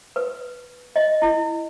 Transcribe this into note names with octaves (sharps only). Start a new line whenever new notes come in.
B4
D#5
E4